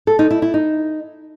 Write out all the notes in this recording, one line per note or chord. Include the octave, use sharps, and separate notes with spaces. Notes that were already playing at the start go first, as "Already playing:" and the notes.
A4
D#4
E4
E4
D#4